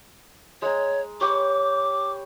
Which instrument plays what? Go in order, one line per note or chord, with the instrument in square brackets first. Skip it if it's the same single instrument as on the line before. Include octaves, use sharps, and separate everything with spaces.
[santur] G#3 A#5 [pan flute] C#5
[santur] G4 B4 C#5 [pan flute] D6